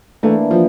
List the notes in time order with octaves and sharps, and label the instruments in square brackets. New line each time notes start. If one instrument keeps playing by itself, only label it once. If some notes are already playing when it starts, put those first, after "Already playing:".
[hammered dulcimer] E3 A#3 D4 [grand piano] A3
[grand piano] F3